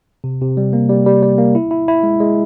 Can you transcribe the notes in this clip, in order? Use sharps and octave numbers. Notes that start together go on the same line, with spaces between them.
C3
C3
G3
A#3
G3
G3
G3
A#3
E4
E4
E4
G#3
G#3